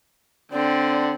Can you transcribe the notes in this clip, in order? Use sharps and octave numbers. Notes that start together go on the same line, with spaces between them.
D3 C4 D5